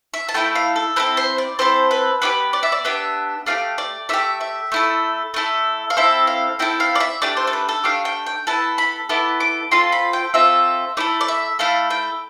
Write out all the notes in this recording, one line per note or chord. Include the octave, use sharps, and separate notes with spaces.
E5
A5
A3 E4 A4 G5
F5
A4
C4 E4 A4 B4
C5
D5
C4 E4 A4 C5
B4
B3 D4 G4 B4
D5
E5
D5
B3 D4 G4 E5
A3 D4 G4 F5
D5
A3 D4 G4 E5
E5
A3 E4 A4
A3 E4 A4
F5
C4 E4 A4 E5
F5
C4 E4 A4 G5
F5
D5
E5
A3 D4 G4 D5
C5
A4
B4
A4
A3 D4 G4 F5
G5
G5
B3 E4 A4 A5
B5
B3 E4 A4 D6
D6
C4 F4 A4 C6
B5
G5
C4 F4 A4 E5
A3 E4 A4 D5
D5
E5
A3 E4 A4 F5
G5